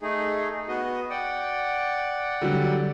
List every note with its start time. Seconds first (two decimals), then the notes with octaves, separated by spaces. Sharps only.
0.01 A3 D#4 G#4
0.68 B3 F#4 D#5
1.10 D5 F#5 G5
2.41 D3 F#3 G3